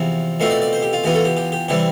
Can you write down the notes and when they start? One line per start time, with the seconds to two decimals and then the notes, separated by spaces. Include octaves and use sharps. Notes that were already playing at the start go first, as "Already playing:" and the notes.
Already playing: E2 C3 F3
0.40 B2 A3 C4 F4 C6
0.50 D5
0.62 D5
0.73 C5
0.82 G4
0.93 F4
1.04 E3 B3 F4 G4
1.14 A4
1.25 G4
1.37 G4
1.52 G4
1.68 C3 E3 G3 G4